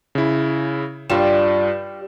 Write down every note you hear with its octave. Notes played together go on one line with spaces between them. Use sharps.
C#3 E4
G2 G3 F4 E7